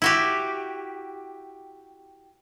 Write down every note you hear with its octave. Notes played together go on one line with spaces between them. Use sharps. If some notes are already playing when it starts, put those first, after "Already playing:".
E4 F#4 G4